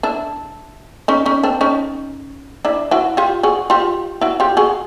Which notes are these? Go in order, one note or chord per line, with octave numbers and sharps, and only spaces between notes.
D4 E4
C#4 D#4
C#4 D#4
C4 D4
C#4 D#4
D4 E4
E4 F#4
F4 G4
F#4 G#4
F4 G4
E4 F#4
F4 G4
F#4 G#4